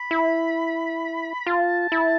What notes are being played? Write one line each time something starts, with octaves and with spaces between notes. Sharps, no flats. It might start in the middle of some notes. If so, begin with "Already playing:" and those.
Already playing: B5
E4
F4 A5
E4